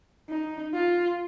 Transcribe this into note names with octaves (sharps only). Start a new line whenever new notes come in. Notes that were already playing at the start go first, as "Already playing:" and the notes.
D#4
F4